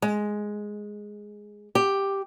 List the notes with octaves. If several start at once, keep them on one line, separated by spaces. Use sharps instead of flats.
G#3
G4